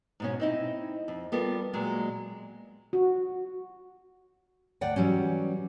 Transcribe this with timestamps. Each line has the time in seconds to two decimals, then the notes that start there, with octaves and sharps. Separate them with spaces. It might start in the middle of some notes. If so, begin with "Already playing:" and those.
0.20 G#2 B2 C#4
0.40 C4 D#4 E4
1.08 F2
1.32 G3 B3 F4 A4 A#4
1.73 A#2 F#3 G#3
2.93 F#4
4.81 D2 D5 F#5 G5
4.96 E3 F#3 G3 C#4